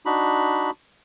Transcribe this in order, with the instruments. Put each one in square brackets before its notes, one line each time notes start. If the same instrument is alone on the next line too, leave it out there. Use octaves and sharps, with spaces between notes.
[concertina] D4 D#4 F#4 B5